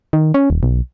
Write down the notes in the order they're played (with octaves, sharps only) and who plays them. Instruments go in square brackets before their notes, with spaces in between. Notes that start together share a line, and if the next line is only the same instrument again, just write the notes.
[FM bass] D#3
C#4
D#1
B1